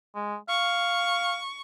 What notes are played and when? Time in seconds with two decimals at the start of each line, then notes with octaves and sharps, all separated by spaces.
0.15 G#3
0.49 F5 C#6